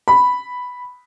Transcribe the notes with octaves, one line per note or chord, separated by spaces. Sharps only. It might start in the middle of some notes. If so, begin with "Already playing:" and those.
B5